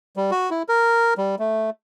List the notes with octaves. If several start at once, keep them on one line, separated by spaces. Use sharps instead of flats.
G3
F#4
E4
A#4
G3
A3